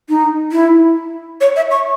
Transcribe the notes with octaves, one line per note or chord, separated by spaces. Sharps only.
D#4
E4
C#5
E5
C#6